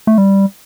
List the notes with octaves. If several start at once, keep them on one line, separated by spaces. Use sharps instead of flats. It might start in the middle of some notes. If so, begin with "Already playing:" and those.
A3
G3